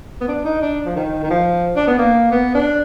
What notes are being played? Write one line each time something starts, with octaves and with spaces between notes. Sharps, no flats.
B3
D4
D#4
D4
F3
D#3
D#3
F3
D4
B3
A#3
B3
D4